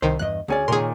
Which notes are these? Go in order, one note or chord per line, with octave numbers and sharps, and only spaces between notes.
C2 D#3 C5
E2 G2 D#5 F#6
D2 C#4 G#4 C#5 D5 G#5
A#2 D#3 G#4 A#4 C#5 C6